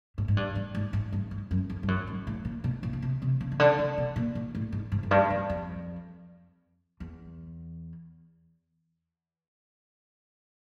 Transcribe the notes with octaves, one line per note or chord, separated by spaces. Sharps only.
G#2
G#2
G2
G2
G#2
G#2
G2
G#2
F#2
F2
G2
F#2
G#2
A2
A#2
B2
A#2
B2
C3
C3
C#3
C#3
D3
C#3
B2
A#2
A#2
A2
G#2
G#2
F#2
G2
F#2
F2
E2